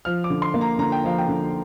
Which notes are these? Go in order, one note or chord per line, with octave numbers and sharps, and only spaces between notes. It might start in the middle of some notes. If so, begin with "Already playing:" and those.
F3 F6
D6
D3
C6
A#3
A#5
D3 A#5
G5
F3 F5
G5
D3